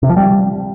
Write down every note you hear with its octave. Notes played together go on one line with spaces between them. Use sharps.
C3
F3
G3